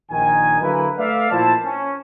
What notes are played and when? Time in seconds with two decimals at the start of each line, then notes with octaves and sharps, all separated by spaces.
0.11 A#1 D#3 G#5
0.61 D3 F#3 A#3 E4 B4
0.98 A3 B4 D5 E5 F5
1.31 A#2 F3 E4 C5 A5
1.64 C#4